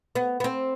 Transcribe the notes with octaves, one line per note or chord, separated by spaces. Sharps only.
B3
B3
C4